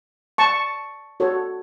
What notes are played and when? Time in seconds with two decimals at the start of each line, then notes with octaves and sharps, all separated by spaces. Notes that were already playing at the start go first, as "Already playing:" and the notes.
0.38 A5 C#6
1.20 F#4 A4 C#5